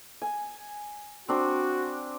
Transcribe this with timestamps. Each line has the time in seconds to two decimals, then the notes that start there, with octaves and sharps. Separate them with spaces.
0.22 G#5
1.29 C4 D4 F#4